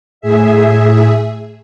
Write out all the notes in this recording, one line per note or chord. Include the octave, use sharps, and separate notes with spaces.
A2 G#4 E5